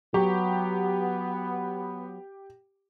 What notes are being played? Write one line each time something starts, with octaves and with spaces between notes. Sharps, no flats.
F#3 B3 G4